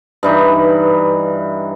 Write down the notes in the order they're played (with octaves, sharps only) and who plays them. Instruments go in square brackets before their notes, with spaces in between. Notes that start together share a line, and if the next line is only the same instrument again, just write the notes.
[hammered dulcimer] G2 E3 D#4